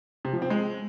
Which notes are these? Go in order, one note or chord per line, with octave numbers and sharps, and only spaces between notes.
C3
F3
C4
G#3